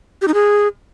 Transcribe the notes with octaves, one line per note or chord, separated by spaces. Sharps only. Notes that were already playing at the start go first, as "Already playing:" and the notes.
G4
D#4
G#4